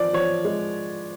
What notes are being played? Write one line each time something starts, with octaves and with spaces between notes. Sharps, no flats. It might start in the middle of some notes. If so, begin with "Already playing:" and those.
Already playing: F3 D5
F3 C#5
G#3